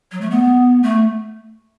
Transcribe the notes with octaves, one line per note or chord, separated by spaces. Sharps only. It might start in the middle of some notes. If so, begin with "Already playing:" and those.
F#3
A3
B3
A3